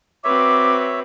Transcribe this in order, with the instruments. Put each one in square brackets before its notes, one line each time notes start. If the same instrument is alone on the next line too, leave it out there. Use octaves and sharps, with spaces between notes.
[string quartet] C4 F#4 B4 [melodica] C#5 E5 [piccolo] D6